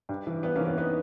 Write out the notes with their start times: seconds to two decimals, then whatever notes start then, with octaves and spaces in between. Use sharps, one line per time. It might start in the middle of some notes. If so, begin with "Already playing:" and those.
0.09 G2
0.27 E3
0.43 G2 B3
0.55 A#3 C#4
0.60 E3
0.67 B3
0.77 B3 D#4